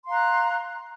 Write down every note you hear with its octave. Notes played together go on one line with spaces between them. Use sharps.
F5 A#5 C6 F#6